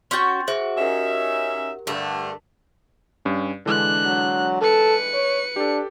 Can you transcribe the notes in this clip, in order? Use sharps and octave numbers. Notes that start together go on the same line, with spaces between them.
C#4 F#4 G5 C6 G6 A6
F#4 G#4 C5 E5
C#4 D#4 G4 A#4 E5
G2 D3 A3
G2 C#4
D3 E3 G#3 D4 F#6
F#3
A4 B4 C#7
C#5
D4 G4 A4